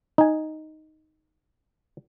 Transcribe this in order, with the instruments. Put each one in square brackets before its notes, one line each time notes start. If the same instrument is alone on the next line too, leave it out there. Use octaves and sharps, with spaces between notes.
[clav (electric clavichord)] D#4 G#5